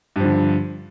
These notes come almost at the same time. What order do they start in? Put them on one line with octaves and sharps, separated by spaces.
G2 F3 D3